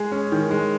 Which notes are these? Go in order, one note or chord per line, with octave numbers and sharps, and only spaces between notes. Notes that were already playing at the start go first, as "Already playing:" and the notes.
Already playing: G#3 G#4
C#4
D#3
G#3